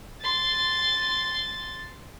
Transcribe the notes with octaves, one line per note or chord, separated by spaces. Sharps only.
C6 A6